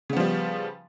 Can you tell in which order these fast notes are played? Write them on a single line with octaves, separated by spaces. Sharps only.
C#3 B3 F3 G3